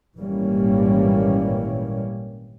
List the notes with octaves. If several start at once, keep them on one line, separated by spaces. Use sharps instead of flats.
G#1 A#2 E3 G3 A#3 C#4